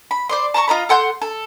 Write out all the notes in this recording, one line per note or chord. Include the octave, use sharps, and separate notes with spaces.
B5
C5 D5 C6
A5 A#5 C6 C#6
F4 D#5 A#5 B5
A4 F#5 C6 G6
A4